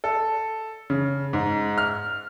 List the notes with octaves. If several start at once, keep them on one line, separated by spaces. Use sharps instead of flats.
A4
C#3
G#2
F6